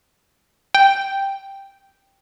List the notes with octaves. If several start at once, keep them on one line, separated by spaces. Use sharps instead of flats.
G5